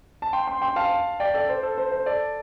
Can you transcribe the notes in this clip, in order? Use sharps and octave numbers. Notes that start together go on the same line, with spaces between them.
A5
G5 C6
G5 C6
G5 C6
F5 A5
D5 G5
A4 D5
C5
A4
C5
C5
A4 D5